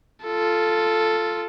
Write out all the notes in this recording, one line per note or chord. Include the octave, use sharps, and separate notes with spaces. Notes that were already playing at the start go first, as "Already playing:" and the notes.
F4 A4